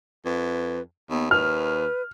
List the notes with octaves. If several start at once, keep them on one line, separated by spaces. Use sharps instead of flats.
F2 B4
D#2 B3
D#2 B4 F6